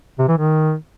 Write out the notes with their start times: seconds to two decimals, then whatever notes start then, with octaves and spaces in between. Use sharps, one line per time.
0.19 C3
0.28 E3
0.38 D#3